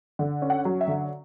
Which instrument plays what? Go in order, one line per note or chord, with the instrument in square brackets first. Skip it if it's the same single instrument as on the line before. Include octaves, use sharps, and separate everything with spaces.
[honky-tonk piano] D3
C#4
F#5
F#3
E5
D3